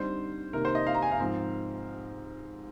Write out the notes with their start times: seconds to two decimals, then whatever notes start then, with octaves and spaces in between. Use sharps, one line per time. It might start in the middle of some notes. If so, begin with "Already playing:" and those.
Already playing: D3 G3 C4 D#4 C5
0.53 C3 D#3 A#3 A#4
0.65 C5
0.75 D#5
0.87 F5
0.95 A#5
1.02 G#5
1.12 F5
1.19 G#2 F3 C4